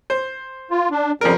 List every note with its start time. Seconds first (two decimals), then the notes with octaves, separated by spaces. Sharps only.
0.10 C5
0.71 F4
0.91 D4
1.21 F2 C#3 F3 G3 A#4